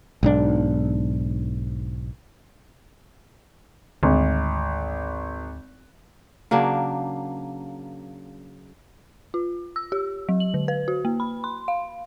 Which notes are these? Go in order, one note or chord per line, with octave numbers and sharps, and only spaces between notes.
B1 G#2 D4
G#1 D2
C#3 F#3 A#3 D4
F4
E6
G4
F#3
F#7
D3
B4
F#4
A#3
B5
C6
F5